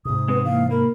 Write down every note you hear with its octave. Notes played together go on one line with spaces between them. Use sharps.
G#2 C3 D#6
G#3 B3 C4 B4
E3 A#3 F5
A#3 A#4 B5